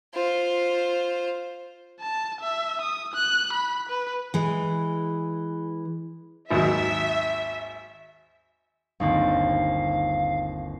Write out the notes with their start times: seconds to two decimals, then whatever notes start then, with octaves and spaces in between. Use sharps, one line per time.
0.14 F4 C5
2.00 A5
2.41 E5
2.81 D#6
3.14 F#6
3.53 B5
3.89 B4
4.34 E3 G#3
6.50 G#1 D#2 F#3 E5
9.00 G1 D#2 C4 F5